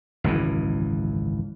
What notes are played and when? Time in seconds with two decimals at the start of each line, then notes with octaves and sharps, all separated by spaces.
0.24 G#1 C#2 F#2 E3